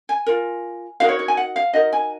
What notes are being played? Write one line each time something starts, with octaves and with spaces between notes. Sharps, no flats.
G#5
F4 A#4
D#4 F#4 A#4 F5
C#5
C#5
G#5
F#5
F5
D#4 F#4 A#4 D#5
G#5